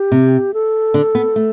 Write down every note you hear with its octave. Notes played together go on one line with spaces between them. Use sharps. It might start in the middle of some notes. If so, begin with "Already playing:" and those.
Already playing: G4
C3
A4
D3
B3
A3